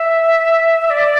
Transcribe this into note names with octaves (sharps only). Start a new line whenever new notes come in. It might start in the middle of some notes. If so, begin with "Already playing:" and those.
Already playing: E5
D5